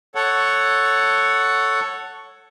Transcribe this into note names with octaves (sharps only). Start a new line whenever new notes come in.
A4 C#5 F#5